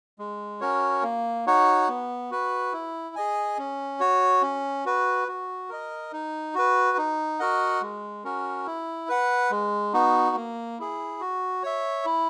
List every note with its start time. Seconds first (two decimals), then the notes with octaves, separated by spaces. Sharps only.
0.19 G#3
0.61 C#4 F#4 A#4 C#5
1.03 A#3
1.47 D#4 F#4 C#5 F#5
1.88 B3
2.31 F#4 B4
2.73 E4
3.16 G#4 D#5 G#5
3.58 C#4
4.00 F#4 C#5
4.42 C#4
4.86 F#4 B4
5.28 F#4
5.69 A#4 D#5
6.12 D#4
6.55 F#4 B4
6.98 D#4
7.40 F#4 A#4 D#5 F#5
7.81 G#3
8.24 C#4 F#4 A#4
8.66 E4
9.09 B4 F#5
9.51 G#3
9.93 B3 D#4 F#4
10.36 A#3
10.79 E4 G#4
11.21 F#4
11.63 C#5 E5
12.05 E4